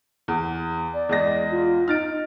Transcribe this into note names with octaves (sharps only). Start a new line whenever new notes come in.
E2
D5
E2 G#3 A#6
F4
D#4 F6 A6 D7